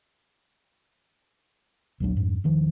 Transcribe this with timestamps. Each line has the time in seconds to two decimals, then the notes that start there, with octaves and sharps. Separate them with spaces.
2.00 A#1 D#2 F#3 D4
2.17 F2 G#2
2.44 E1 D#3 F3